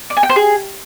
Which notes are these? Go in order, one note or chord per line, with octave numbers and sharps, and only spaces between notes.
D5
G#5
G5
C5
G#4